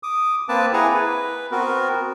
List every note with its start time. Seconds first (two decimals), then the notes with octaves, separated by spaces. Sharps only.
0.03 D6 D#6
0.49 A#3 C4 B4 A5 D6
0.73 E4 G#4 F#5 G#5 A#5
0.88 B4
1.52 B3 C4 F#4 A#4